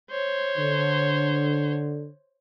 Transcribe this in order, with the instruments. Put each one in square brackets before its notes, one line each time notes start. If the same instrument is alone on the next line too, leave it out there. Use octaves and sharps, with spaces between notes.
[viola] C5 C#5
[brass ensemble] D3